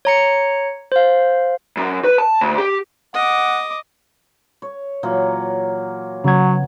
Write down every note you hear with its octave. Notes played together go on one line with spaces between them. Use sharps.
C#5 A#5 C#7
C5 F5
F#2
B4
A5
D2
G4
D#5 F#5 D6
C#5
A#2 E3 F#3
C#3 F#3 B3 G#6